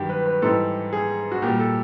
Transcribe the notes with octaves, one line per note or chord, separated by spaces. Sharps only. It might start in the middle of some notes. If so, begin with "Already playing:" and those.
Already playing: G2 D#3 F#3 F#4 G4
B4
B4
G#2 E3 G3 A4
G#4
F#4
A#2 G3 G4
A4